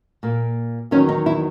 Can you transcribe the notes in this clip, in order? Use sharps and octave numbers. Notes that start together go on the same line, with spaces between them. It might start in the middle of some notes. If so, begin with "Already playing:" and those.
A#2 A#3
E2 D#3 F#3 C#4
D#4
E4